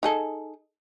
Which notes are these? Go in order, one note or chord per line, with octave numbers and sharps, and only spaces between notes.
D#4 G#4 A4